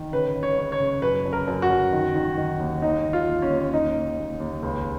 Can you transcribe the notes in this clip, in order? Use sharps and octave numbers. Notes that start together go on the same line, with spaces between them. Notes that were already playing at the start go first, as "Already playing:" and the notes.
Already playing: D#3
C#3 B4
C#3
C#5
C#3
C#5
C#3
F#2 B4
F#2
A#4
F#2
F#4
F#2
D#3
D#3
D#3
D#2
D#2 D#4
D#2
F4
D#2
C#4
D#2
D#2 D#4
D#2
D#2
D#2
C#2